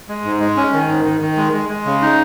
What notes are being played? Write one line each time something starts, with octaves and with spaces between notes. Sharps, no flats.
G#3
G#2
G#3
C#4
D#3
G#2
D#3
D#3
G#3
G#3
G#3
C#3
D#4